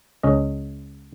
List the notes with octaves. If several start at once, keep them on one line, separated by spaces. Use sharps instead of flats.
C#2 C#4 D#5